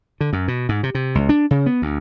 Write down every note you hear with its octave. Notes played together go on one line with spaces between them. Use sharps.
D3
F#2
B2
G#2
C3
C3
C#2
D4
C#3
B3
D2